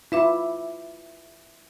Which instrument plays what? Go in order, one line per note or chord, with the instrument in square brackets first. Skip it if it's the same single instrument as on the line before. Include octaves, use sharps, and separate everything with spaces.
[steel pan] E4 F4 [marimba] B4 E5 D6